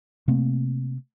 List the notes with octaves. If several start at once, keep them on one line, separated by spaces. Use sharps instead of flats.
C3 A3 A#3 C4